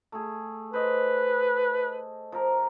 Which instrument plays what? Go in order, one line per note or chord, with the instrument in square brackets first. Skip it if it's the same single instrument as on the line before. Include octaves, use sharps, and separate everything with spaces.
[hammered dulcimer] A3 G#4
[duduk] B4 [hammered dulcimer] C5 D#5
[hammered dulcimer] F3 A#4